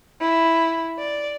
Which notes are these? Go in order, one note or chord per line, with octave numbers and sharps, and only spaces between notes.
E4
D5